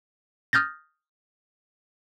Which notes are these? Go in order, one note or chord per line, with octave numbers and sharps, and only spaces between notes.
D#6 F6 G6 A6 A#6